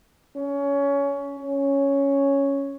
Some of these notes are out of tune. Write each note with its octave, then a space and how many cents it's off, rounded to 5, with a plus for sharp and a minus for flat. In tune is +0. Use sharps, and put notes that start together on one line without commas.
C#4 +20
C#4 +0